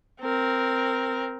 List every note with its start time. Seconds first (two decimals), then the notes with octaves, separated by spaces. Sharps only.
0.21 C4 A#4